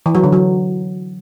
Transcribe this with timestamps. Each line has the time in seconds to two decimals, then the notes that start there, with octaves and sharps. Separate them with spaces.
0.06 E3
0.15 F#3
0.24 D3
0.32 F#3